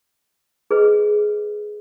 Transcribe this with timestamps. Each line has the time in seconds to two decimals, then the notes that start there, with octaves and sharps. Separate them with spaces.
0.71 G#4 B4 D#5